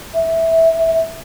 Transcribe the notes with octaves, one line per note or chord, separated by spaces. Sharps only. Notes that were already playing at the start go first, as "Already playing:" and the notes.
E5